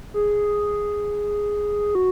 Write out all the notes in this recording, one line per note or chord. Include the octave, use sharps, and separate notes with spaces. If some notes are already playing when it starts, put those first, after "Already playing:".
G#4
F#4